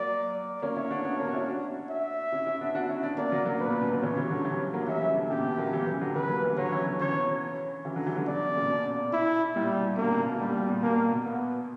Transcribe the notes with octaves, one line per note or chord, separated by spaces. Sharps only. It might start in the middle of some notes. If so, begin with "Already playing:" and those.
Already playing: F#3 A#3 D5
A#3 C#4 C#5
C#4 E4
B3 D4
B3 D4
A#3 C#4
F#4
C#4 E4
D4 F#4
E5
C#4 E4
C#4 E4
B3 D4
D4 F#4
C#4 E4
B3 D4
A#3 C#4 D5
F#3 A#3
F#3 A#3
A#2 C#3 B4
A#2 C#3
B2
A#2 C#3
C#3 E3 C#5
E3 G3
D3 F#3
E3 G3
F#3 A#3
E3 G3 E5
C#3 E3
B2 D3
A#2 C#3 G4
B2
F#3 A#3
E3 G3
C#3 E3
D3 F#3
E3 G3 B4
F#3 A#3
E3 G3
D3 F#3 C#5
C#3 E3
B2 D3
C#3 E3 C#5
C#3 E3
D3 F#3
E3 G3
D3 F#3
B2 D3 D5
A#2 C#3
B2
E4
A#2 G3
B2
B2 D3 A#3
A#2 C#3
B2
A#2 G3
B2
A#2
B2 A#3
A#2
B2
B3